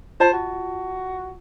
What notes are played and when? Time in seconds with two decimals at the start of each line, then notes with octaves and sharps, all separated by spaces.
0.20 F4 C5 D#5 A5
0.33 F#4